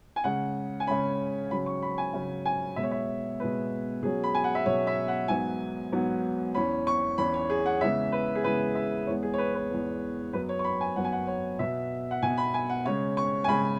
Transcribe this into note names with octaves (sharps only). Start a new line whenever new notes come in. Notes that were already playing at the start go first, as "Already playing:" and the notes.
G#5
C#3 G#3 C#4 F#5
G#5
C#3 G#3 C#4 B5
C#3 F#3 C#4 B5
C#6
B5
G#5
C#3 F#3 C#4
G#5
B2 G#3 B3 E5
C#5
E5
B2 G#3 B3 B4
B2 F#3 C#4 G#4
B5
G#5
F#5
E5
B2 F#3 C#4 C#5
E5
F#5
G#2 F#3 B3 G#5
G#2 F#3 B3
E2 E3 C#4 B5
C#6
E2 E3 C#4 B5
C#5
G#4
F#5
C#3 E3 G#3 B3 E5
B4
G#4
C#3 E3 G#3 B3 B4
E5
E2 E3 G#3 B3 C#5
G#4
C#5
B4
B4
E2 E3 G#3 B3
F#2 F#3 B3 B4
C#5
C#6
B5
G#5
F#2 F#3 B3 F#5
G#5
F#5
C#5
B2 B3 E5
F#5
B2 B3 G#5
B5
G#5
F#5
C#3 G#3 C#4 C#5
C#6
G#5
C#3 G#3 C#4 B5